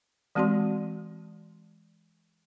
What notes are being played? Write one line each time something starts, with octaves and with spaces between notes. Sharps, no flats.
E3 G#3 C4 F#4 D5 C6